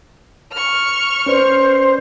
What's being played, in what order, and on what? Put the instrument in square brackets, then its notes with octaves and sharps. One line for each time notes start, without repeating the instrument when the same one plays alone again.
[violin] C#6 F6
[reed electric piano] C#4 B4 D5 [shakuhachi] C5